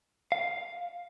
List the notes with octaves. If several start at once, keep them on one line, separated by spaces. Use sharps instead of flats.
F5